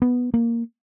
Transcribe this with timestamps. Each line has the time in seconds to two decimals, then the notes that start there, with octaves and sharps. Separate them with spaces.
0.02 B3
0.34 A#3